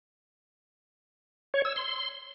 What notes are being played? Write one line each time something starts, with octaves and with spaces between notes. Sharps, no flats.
C#5
E6
C6